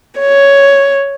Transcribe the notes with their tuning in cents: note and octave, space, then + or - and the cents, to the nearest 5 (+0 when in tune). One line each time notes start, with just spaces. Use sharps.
C#5 +5